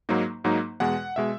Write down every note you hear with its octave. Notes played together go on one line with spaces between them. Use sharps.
G#2 F#3 A#3 D#4
G#2 F#3 A#3 D#4
E2 B2 G#3 F#5
B2 G#3 E5